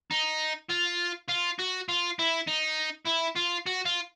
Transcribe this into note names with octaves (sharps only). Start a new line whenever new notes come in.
D#4
F4
F4
F#4
F4
E4
D#4
E4
F4
F#4
F4